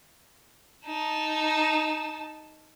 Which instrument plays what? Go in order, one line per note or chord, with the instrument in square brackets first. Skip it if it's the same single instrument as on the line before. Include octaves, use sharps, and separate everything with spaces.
[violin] D#4 A5